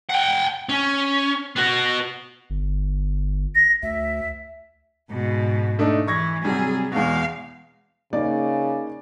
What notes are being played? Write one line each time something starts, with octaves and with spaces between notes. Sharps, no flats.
F#5 G5
C#4
B3 F#4
G1
A#6
D2 E5
G#2 B2
A3 D4 D#4
E3 C#6 G#6 A#6
C3 F#3 G3 G#4
E2 B2 G#3 F5
C#3 A#3 D#4 D5